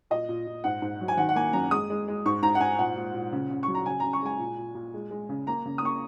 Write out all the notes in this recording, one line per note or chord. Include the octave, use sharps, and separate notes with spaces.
A#2 D#5
A#2
A#2
G#2 F#5
G#2
F#3
G#5
D#3 F#5
F#5
A#3 G#5
F#2 A#5
G#3 D#6
G#3
G#3
G#2 C#6
G#2 A#5
F#5
G#2 G#5
A#2 F#5
A#2
A#2
C#3
C#3
F#3 C#6
A#5
C#3 G#5
C#3 A#5
C#6
G#3 G#5
A#2
A#2
A#2
G#3
G#3
C#3
A#3 A#5
C#3
D#6
A#3 C#6